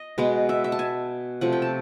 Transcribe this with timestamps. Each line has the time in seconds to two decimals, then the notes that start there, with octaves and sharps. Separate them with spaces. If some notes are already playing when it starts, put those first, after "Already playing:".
Already playing: D#5
0.18 B2 G#3 B3
0.49 E5
0.64 E5
0.72 A5
0.79 G#5
1.41 C3 F3 A3 F#5
1.52 G5
1.62 A5